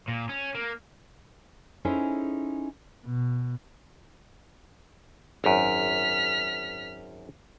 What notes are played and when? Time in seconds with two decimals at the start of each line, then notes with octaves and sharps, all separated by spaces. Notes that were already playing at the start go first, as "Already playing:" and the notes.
0.08 A#2
0.29 C#4
0.55 A#3
1.85 C#4 D#4 E4 G#4 A4 C5
3.05 B2
5.44 G#1 F#2 F6 B6